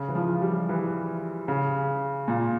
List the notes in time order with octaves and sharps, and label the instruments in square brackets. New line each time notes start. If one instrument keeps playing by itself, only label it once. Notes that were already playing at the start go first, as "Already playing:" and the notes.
Already playing: [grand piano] C#3
E3
F3
G3
E3
C#3
A#2